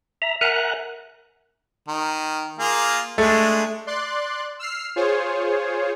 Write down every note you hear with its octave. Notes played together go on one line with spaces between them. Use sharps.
E5 A#5
A#4 E5 F#5 G#5 A#5 F#6
D#3
A#3 F4 G#4
G#3 A3 D4
D5 C6 F#6
E6 F6 C7
F4 G#4 C5 C#5